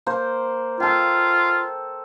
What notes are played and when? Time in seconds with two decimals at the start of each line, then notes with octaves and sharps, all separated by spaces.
0.06 A#3 C5
0.80 F4 A4 G5